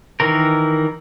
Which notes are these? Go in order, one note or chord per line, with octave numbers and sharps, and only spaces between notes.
D#3 E3 A#4